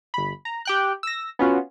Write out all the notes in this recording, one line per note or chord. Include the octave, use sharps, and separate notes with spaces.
G1 B5
A#5
G4 G5 F#6
E6 A#6
B3 C#4 F4 F#4